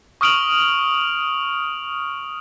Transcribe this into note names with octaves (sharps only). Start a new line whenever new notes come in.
C#6 D#6 F6 D7 F7 F#7